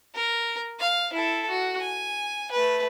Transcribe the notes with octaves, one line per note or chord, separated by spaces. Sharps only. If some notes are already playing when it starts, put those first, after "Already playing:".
A#4
F5
E4 A4
F#4
G#5
A3 B4